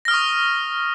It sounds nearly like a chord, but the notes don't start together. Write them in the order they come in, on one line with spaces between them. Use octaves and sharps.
A#6 F6 D#6 C#6